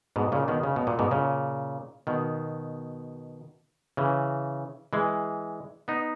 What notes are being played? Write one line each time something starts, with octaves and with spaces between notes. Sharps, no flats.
G#2 B2
A#2 C#3
B2 D#3
C#3
B2
A#2
G#2 B2
A#2 C#3
B2 D#3
C#3 E3
E3 G#3
B3 D#4